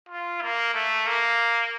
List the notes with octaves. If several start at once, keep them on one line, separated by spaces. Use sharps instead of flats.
F4
A#3
A3
A#3